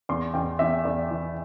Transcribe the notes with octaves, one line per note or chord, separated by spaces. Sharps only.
E2 C6
E2 G5
E2 E5
E2 D5
E3